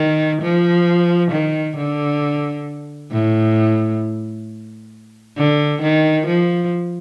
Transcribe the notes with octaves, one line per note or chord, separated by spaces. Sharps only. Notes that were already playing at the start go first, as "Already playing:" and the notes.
Already playing: D#3
F3
D#3
D3
A2
D3
D#3
F3